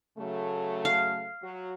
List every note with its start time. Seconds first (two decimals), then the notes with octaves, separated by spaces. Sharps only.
0.17 C#3 F#3 A3
0.85 F5
1.42 F#3 F#4